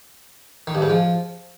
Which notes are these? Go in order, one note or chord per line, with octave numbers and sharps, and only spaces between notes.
D#3
G2
G#2
F3